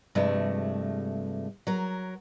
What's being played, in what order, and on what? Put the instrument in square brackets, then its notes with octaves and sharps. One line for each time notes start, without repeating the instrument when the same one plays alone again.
[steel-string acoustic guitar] G2 C3 F3 G#3 A3
F#3 A#4